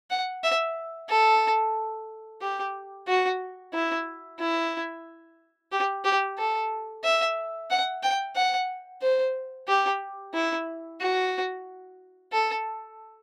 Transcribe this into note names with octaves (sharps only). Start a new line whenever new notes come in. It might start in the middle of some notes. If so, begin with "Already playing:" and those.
F#5
E5
A4
G4
F#4
E4
E4
G4
G4
A4
E5
F#5
G5
F#5
C5
G4
E4
F#4
A4